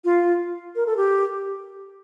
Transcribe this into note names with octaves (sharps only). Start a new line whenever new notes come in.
F4
A#4
A4
G4